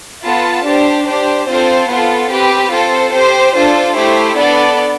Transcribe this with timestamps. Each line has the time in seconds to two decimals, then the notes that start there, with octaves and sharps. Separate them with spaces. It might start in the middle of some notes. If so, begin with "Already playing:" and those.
0.23 B3 F4 A4 A5
0.65 D4 G4 C5
1.06 D4 G4 C5
1.48 C4 F4 A4 C5
1.88 B3 F4 A4
2.30 C4 G4 B4
2.72 C4 F4 A4 C5
3.13 C4 G4 C5
3.55 D4 F4 A4 C5
3.96 A3 E4 G4 C5
4.37 B3 D4 A4 D5